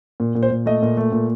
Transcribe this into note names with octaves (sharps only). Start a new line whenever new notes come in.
A#2
A#2
C5
A#2
A3 D#5
A#2
A3
A#2